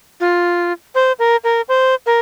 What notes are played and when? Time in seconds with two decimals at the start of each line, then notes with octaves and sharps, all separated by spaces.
0.20 F4
0.95 C5
1.19 A#4
1.44 A#4
1.69 C5
2.06 A#4